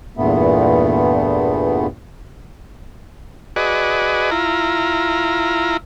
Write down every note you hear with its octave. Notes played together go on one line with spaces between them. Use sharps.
E2 G2 A#2 A3 B3
F#4 G#4 B4 D5 D#5
E4 F4 A#5